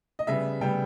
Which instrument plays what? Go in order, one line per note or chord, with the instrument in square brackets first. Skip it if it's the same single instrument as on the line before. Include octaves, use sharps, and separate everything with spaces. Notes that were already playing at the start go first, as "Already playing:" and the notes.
[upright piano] D#5
C#3 G3 B3 E5
C#3 G3 B3 G5